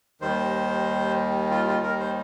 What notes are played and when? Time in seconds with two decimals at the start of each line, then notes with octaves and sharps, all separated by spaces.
0.21 D#2 D#3 G3 C5
1.51 F4
1.68 F4
1.83 A#4
2.00 C5